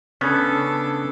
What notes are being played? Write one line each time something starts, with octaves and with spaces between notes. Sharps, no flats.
C#3 B3 C#4 D4 A4